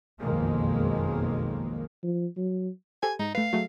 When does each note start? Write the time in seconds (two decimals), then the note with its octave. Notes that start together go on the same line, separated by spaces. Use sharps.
0.20 F#1 B1 F2 D#3 G#3 A#3
2.03 F3
2.37 F#3
3.03 G4 A4 C5 G#5
3.19 G#2 D#4
3.35 A3 B4 F5
3.53 F#3 A3 G#4